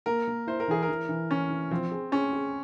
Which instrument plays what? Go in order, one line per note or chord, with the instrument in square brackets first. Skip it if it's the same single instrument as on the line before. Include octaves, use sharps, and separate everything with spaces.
[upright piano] A#3 [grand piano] A#4
[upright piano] A#3
[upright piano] E4 [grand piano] C5
[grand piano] A#4
[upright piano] E3 [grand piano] G#4
[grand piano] A#4
[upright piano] E3
E3
[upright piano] E3 [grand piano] C#4
[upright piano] E3
[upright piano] F3 [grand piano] C4
[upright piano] G#4
[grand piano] C#4 [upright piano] G#4
[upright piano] G#4